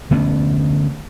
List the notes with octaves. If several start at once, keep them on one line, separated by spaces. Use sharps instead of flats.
D3 A3 B3 C#4